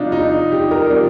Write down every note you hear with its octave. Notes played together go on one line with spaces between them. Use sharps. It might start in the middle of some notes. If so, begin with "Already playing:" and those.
Already playing: C3 F3 D4 D#4 F4
D#4
G4
A#4
C3 F3 D5